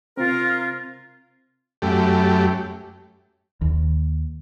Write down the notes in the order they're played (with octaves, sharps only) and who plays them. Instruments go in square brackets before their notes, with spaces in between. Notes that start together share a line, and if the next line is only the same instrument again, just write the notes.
[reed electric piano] C3 C4 [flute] F4 [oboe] A#4
[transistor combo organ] F#2 A3 G4
[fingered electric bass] D#2